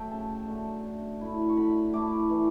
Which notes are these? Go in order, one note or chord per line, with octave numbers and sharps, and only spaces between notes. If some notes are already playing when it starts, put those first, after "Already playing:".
Already playing: F#3 A3 E5 G5
C#3 A5
F#3 A3 D4
D3
A3 E4
C#6
D3 B5
A3 E4 D6
E3